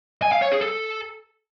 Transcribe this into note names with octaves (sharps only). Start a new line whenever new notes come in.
G#5
F5
C#5
G#4
A4